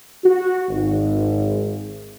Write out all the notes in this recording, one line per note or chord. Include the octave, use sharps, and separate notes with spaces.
F#4
G#1